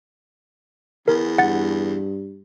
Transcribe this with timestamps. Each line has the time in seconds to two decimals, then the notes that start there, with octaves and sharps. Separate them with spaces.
1.08 E2 A#4
1.38 G2 F#5 A6